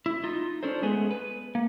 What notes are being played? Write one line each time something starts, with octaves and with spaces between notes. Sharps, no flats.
E4
D#4 F4
C#4 D4 A4 C5
G#3 A3 B3 G#4 A4
B4
A#3